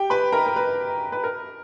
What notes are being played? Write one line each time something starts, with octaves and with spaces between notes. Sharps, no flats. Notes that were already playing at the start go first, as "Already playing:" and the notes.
Already playing: G4 G5
B4 B5
A#4 A#5
A#4
B4
B4
A#4